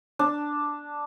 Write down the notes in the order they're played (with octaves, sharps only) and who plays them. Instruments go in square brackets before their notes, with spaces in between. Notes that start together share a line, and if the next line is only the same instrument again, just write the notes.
[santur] D4